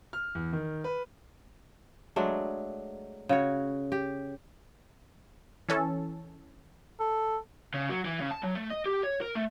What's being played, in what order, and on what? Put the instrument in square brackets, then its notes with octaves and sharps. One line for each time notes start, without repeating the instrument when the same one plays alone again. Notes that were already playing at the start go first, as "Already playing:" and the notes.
[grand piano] F6
E2
D#3
B4
[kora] F#3 G#3 A3 D4
C#3 F#4 C#5
G4
[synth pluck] E3 C#4 A4
[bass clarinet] A4
[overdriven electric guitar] C#3
F#3
E3
C#3
A5
F#3
A3
D#5
G4
C#5
A#4
A3